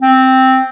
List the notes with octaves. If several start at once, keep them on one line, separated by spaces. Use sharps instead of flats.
C4